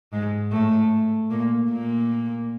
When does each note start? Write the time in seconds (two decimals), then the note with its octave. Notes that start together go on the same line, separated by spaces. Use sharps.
0.13 G#2 G#3
0.52 A2 A3
1.31 A#2 A#3
1.71 A#2 A#3